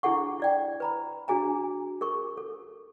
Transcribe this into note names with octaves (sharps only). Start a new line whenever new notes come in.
D4 E4 G#4 A4 F#5 C#6
E4 D5 G5
B4 A#5 B5
D4 F#4 G#4 G#5 A#5
G#4 A#4 C#6
A4